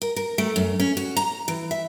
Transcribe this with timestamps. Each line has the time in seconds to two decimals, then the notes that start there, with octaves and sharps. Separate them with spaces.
0.02 A#4
0.16 A#4
0.38 A3
0.56 F#2
0.80 C#4
0.97 F#4
1.17 A#5
1.48 E3
1.71 E5